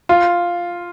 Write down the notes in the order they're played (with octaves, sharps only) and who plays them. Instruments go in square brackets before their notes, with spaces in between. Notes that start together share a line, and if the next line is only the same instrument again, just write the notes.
[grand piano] F4